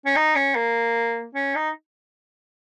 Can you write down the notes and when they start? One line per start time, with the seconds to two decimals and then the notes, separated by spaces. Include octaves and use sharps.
0.06 C#4
0.16 D#4
0.36 C#4
0.55 A#3
1.35 C#4
1.55 D#4